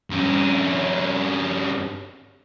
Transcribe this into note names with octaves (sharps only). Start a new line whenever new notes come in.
G2 C#4